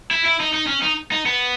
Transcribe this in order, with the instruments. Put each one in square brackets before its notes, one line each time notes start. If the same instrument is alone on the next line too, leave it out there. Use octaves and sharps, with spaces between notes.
[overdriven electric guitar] E4
E4
D#4
D#4
C#4
D#4
D#4
B3